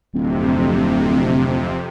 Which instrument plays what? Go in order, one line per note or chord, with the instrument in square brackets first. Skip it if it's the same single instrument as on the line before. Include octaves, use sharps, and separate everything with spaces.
[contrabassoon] D1 [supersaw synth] F2 C3